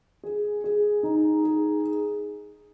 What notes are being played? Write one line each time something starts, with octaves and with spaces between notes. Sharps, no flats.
G#4
G#4
D#4
G#4